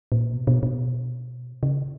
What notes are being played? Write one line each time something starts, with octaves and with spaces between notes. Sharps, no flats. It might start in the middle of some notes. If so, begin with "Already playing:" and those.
A#2
B2
B2
B2
C#3